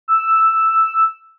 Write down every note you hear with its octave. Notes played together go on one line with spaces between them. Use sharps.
E6